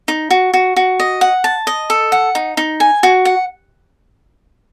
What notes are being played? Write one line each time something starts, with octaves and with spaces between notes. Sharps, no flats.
D#4
F#4
F#4
F#4
D#5
F#5
A5
D#5
A4
F#5
D#4
D#4
G#5
F#4
F#5